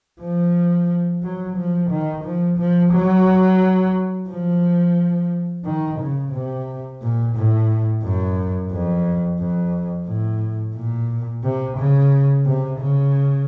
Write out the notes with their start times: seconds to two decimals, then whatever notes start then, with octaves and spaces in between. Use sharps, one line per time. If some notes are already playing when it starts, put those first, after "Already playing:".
0.20 F3
1.23 F#3
1.57 F3
1.90 D#3
2.25 F3
2.59 F3
2.93 F#3
4.29 F3
5.65 D#3
6.00 C#3
6.33 C3
7.02 A#2
7.35 A2
8.03 F#2
8.71 F2
9.39 F2
10.07 A2
10.75 A#2
11.44 C3
11.77 C#3
12.46 C3
12.80 C#3